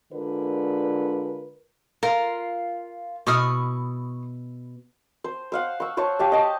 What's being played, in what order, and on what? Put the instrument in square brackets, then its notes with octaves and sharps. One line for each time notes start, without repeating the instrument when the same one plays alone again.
[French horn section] D3 G#3 F4 A#4 B4 D5
[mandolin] F4 [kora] A#4
[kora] B2 E4 [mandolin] C#6 D#6 F6
[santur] C5
C5 F5 F#5
C#6 E6
C5 C#5 A5 C#6
G4 F5 A5
D#5 A5